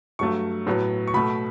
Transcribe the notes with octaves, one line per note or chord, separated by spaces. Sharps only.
G2 F#3 A3 C#6
A2 F#3 B3
C#6
B2 A3 B5